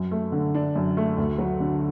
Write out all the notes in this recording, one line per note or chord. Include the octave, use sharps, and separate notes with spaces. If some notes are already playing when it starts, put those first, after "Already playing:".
Already playing: F#2
A3
D3
D4
F#2
A3
D2
F#3
D3